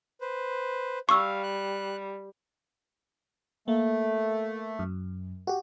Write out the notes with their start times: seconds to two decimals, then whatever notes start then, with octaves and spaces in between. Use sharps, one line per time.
0.21 B4 C5
1.09 G3 F5 C#6 E6
1.43 F#6
3.68 A3 A#3
4.79 F#2
5.47 F#4 G4